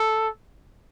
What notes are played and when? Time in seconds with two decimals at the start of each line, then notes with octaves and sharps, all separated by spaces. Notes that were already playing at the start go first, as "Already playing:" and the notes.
Already playing: A4